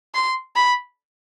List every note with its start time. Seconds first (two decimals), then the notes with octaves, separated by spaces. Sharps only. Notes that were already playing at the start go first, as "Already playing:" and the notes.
0.15 C6
0.56 B5